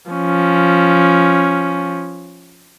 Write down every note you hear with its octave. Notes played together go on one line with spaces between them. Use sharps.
F3 C#4